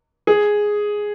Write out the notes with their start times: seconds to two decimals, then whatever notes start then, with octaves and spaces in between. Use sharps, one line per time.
0.27 G#4